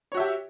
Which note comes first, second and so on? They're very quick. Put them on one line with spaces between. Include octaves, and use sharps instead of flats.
C#5 F#4 E5 G4